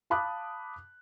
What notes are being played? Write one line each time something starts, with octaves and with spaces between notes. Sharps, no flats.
F5 A5 B5 D6 D#6 F#6